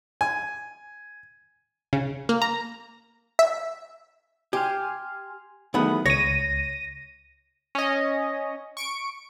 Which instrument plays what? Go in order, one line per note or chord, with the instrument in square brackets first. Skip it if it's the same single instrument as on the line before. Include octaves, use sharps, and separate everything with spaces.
[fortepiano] G#5
[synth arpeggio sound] C#3
A#3
A#5
E5
[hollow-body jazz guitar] G4 [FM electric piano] G#5 C6 F6
[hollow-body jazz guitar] E2 B3 F#5 [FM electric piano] D#3 F#3 A3
[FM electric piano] C#2 [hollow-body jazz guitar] C#5 [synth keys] A#6 D#7
[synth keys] C#4 D#5
C#6 D7